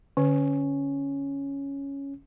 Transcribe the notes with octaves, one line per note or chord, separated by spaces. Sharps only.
D3 C#4